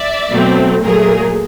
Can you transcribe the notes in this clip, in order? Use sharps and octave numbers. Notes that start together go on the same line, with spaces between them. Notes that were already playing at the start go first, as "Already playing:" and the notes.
Already playing: D5 E5
B2 F#3 A3 C4
A#2 F#3 A3 G#4 A#4